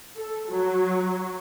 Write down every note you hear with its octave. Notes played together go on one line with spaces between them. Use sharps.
A4
F#3